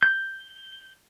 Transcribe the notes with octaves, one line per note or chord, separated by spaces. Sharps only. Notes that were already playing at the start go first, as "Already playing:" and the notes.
G6